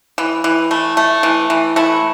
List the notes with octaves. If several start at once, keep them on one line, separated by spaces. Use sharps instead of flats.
E3
E3
A3
A3
E3
E3
A3 E4